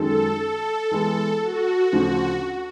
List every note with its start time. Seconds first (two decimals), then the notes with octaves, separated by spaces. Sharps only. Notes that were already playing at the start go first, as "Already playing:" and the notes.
Already playing: F#2 D#3 G#3 A4
0.41 A4
0.91 E3 G#3 B3
1.41 F#4
1.92 D2 C#3 F3